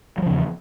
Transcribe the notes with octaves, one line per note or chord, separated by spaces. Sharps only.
E2 C#3 F3 F#3